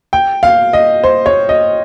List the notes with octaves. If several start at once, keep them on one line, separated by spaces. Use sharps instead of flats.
G5
F5
D#5
C5
C#5
D#5